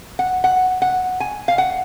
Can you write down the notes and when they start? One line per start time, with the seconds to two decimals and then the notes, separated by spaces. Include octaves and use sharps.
0.19 F#5
0.44 F#5
0.82 F#5
1.20 G#5
1.48 F5
1.58 F#5